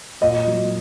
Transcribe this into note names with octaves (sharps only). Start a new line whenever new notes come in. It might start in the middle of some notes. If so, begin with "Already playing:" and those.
A#2 D#5
F#3